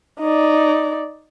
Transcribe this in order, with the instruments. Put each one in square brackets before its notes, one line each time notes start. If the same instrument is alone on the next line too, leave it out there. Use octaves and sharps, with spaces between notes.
[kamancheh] D#4 D5